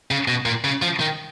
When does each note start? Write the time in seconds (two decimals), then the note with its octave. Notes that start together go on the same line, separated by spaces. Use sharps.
0.11 C#3
0.28 B2
0.45 A#2
0.64 C#3
0.82 F3
1.00 D#3